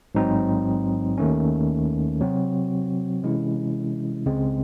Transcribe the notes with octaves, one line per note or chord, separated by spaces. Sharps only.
A1 G#2 F#3 C4 D#4
D#2 D#3 A3 C#4
C3 F#3 C4 F#4
C3 E3 G#3 C#4 E4
C#2 C#3 G#3 C4